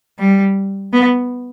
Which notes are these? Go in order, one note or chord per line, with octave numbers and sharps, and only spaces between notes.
G3
B3